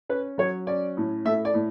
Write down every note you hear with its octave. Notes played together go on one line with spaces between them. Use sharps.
C#4 B4
F#3 C#5
C#4 D5
A2
A3 E5
D5
A2